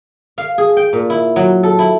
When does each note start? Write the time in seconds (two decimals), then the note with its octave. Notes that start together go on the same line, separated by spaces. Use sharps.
0.38 F5
0.58 G#4
0.77 G5
0.93 A#2
1.10 E4
1.36 F#3
1.63 A4
1.79 E4